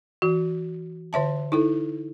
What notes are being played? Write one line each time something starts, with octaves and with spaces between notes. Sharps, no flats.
E3 F#4
D3 C#5 E5 A5
D#4 E4 A4